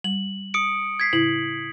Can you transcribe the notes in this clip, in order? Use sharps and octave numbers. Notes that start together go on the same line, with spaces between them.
G3 F#7
D#6 C#7 D7
G#6 B6 C7
A2 C#3 E4 F#7